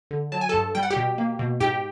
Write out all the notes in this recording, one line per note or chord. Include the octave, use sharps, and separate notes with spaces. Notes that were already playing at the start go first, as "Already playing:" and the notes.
D3
F#3 A5
G#5
G2 A4 A5
G3 G5
F#5
G4 G5
B2
A#3
B2
G#2 G4 G5